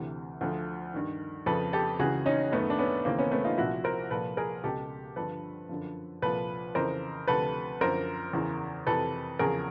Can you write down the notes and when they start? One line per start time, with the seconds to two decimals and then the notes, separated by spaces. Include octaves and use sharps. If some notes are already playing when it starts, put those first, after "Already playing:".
Already playing: D2 C3 E3
0.41 D2 D3 F3
0.94 G2 D#3
1.46 F2 C#3 F3 A4 B4
1.73 G4 A4
1.99 C#2 C#3 E3 F#4 G#4
2.26 C#4 D#4
2.52 F#2 D#3 A3 B3
2.70 D4
2.79 B3 C#4
3.05 D#2 C#3 E3 A#3 C4
3.18 B3 C#4
3.31 A3 B3
3.45 D#4 F4
3.58 C2 A#2 F3 E4 F#4
3.84 A#4 C5
4.11 C2 A#2 F3 A4 B4
4.37 G#4 A#4
4.64 C#2 B2 G4 A4
5.16 G2 D3 F3 A4 B4
5.69 F#2 D3 F3
6.22 C2 A#2 F3 A4 B4
6.75 F2 C#3 E3 A#4 C5
7.28 D2 C3 F3 A4 B4
7.81 F#2 D3 F3 A#4 C5
8.33 E2 C#3 E3
8.87 F2 C3 E3 A4 B4
9.39 E2 C#3 F3 G#4 A#4